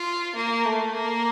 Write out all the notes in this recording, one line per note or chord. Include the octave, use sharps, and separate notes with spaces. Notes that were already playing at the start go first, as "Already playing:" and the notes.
Already playing: F4
A#3
A3
A#3